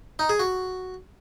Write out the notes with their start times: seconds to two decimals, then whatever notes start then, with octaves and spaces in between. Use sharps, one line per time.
0.19 D#4
0.29 G#4
0.39 F#4